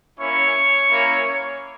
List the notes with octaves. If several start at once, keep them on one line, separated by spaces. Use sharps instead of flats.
A#3 C#4 E4 C#5
A#3 C#4 E4